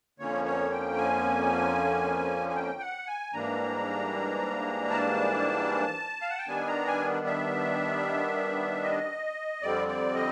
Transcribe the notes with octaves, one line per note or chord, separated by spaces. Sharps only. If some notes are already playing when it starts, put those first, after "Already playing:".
F2 D3 F3 A#3 C#4 C#5
C#5
G5
G#5
G#5
G5
F#5
G#5
G#2 E3 G3 A#3 D4 A#5
A5
F5
F#5
G5
D#3 G3 B3 D4 G#5
A#5
G#5
E5
D#5
F2 D3 G3 C4 D5
D5
D#5